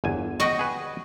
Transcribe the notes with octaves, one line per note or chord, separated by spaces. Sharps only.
G1 E2 G#5
F#4 D#5 G5
G#4 B4